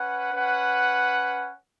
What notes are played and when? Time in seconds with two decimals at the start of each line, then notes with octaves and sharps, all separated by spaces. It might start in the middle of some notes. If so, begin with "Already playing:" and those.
Already playing: C#4 B4 F#5
0.33 C#4 B4 F#5